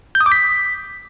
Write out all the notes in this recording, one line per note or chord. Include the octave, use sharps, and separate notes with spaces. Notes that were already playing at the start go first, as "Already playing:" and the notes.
G6
D#6
D6
B6